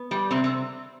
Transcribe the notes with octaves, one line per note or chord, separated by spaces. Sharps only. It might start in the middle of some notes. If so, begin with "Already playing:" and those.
Already playing: B3
G3
C3 C4
C4